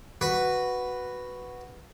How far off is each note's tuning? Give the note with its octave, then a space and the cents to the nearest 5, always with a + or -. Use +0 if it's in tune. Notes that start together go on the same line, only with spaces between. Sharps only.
F#4 +0 B4 +0